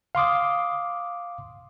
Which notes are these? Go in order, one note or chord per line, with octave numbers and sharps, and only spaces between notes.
F5 C6 D6 D#6